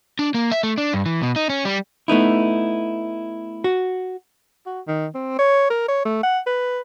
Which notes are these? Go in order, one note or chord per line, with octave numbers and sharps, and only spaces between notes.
D4
A#3
E5
A3
D4
G2
E3
B2
D#4
C#4
G3
A3 B3 D#4 E4
F#4
F#4
D#3
C4
C#5
A#4
C#5
A3
F#5
B4